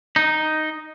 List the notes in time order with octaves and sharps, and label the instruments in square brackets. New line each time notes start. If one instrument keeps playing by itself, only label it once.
[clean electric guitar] D#4